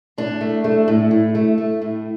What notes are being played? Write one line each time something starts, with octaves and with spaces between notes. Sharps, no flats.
A2 D4
A3
A3
A2
A2
A3
A3
A2